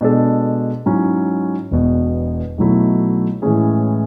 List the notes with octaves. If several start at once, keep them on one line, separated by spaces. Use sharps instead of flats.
B2 G#3 D4 A4
G#2 F#3 C#4 E4
E1 E2 B2
B1 B2 F#3 A3 E4
A2 E3 G#3 C#4 G#4